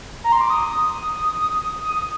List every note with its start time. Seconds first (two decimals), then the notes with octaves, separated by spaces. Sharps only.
0.24 A#5
0.32 C6
0.41 D6
0.50 D#6
1.84 D#6
2.02 D#6